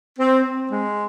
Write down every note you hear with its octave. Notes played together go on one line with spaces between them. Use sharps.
C4
C4
G#3